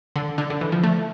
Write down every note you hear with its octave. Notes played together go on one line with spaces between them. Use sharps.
D3
D3
D3
E3
F3
A3